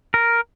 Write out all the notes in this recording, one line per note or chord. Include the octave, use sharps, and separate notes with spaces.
A#4